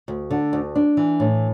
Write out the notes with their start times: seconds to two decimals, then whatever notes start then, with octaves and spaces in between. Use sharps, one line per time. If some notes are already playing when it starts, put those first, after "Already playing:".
0.08 D2
0.31 D3
0.53 D2
0.76 D4
0.97 E3
1.20 A2